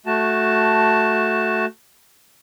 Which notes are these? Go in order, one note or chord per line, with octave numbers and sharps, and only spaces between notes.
A3 F#4 A5